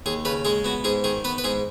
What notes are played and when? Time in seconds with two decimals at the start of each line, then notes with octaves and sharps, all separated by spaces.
0.06 D#2 G#4
0.25 C#3 B4
0.45 G#3 G#4
0.64 B3 F#4
0.84 G#2 G#4
1.04 D#3 G#4
1.24 B3 B4
1.38 B4
1.44 G#2 G#4